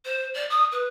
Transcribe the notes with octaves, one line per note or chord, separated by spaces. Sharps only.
C5
D5
D#6
B4